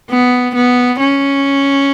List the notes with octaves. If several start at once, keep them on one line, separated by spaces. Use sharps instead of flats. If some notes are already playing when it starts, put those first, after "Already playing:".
B3
B3
C#4